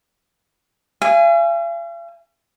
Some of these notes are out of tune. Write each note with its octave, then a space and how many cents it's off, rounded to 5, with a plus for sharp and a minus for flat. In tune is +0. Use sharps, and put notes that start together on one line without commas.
F5 -45 G#5 -10